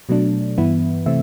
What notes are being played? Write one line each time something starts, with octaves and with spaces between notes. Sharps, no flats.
B2 F#3 A3 D4
G2 E3 B3 E4
C3 E3 A3 C4 E5